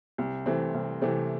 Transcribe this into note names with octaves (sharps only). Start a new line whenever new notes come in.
C2
C3 E3 A3 C4
C2
C3 E3 A3 C4